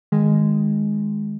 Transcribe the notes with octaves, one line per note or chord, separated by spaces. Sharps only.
D#3 G#3